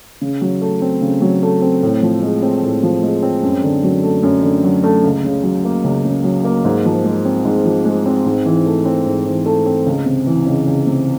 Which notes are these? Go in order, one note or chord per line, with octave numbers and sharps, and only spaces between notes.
C#3
F#3
A3
C4
C#3
F#3
A3
C4
A2
F3
G#3
C4
A2
F3
G#3
C4
F#2
D3
F#3
A3
F#2
D3
F#3
A3
C#2
C#3
F#3
A#3
C#2
C#3
F#3
A#3
G#2
F3
G#3
C4
G#2
F3
G#3
C4
G#2
E3
A3
C4
G#2
E3
A3
C4
C#2
C3
E3
C#2
C#2
C3